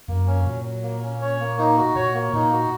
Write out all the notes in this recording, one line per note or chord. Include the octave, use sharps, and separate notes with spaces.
F#2 A#3
C#4
A#2 F#3
F#3
A#3
C#4
C#5
A#3
D#4
F#4
A#2 C#5
A#3
A#2 D#4
F#4